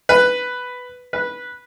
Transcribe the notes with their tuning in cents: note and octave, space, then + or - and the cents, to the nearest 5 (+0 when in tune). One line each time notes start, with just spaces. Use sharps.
B4 +5
B4 -10